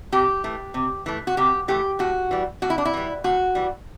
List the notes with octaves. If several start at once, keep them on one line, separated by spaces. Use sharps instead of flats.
C3 G4
E3 A3
C3
E3 A3
F#4
C3 G4
E3 A3 G4
A2 F#4
E3 G3
A2 F#4
E4
D4
E4
E3 G3
A2 F#4
E3 G3